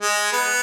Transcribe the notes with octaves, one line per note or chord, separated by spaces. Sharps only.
G#3
B3